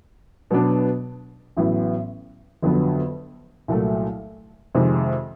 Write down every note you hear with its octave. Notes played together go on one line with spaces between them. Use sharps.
B2 F#3 B3 D4
A1 A2 F#3 B3
G1 F2 D3 F#3 B3
C2 A#2 F#3 A3
F2 C3 D#3 G#3